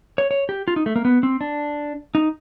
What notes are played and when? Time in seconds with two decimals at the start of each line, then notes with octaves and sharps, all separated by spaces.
0.18 C#5
0.31 C#5
0.49 G4
0.68 F4
0.76 D#4
0.86 A3
0.96 A#3
1.05 B3
1.23 C4
1.41 D4
2.15 D#4